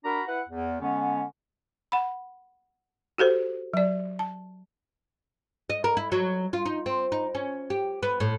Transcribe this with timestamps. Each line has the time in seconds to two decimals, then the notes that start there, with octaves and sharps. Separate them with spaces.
0.04 D4 F#4 A#4 A#5 B5
0.27 E4 B4 F#5
0.49 E2
0.81 D3 G#3 B3 C#4
1.92 F#5 B5
3.18 F#4 G4 A4 C5
3.74 F#3 D5
4.19 A5
5.70 D#5
5.84 A#4
5.97 E4
6.12 F#3
6.53 F4
6.66 D#4
6.86 C4
7.12 D#4
7.35 C#4
7.70 G4
8.03 B3
8.20 A2